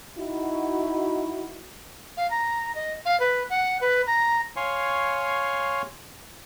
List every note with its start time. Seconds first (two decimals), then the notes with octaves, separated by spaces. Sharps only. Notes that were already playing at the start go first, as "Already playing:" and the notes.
0.18 D#4 E4 F#4
2.17 F5
2.31 A#5
2.75 D#5
3.05 F5
3.20 B4
3.50 F#5
3.81 B4
4.07 A#5
4.56 C#5 F5 G#5 C6 C#6